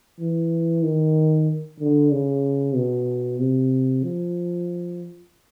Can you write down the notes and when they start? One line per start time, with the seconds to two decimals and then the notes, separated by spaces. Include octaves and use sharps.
0.20 E3
0.83 D#3
1.80 D3
2.11 C#3
2.75 B2
3.39 C3
4.03 F3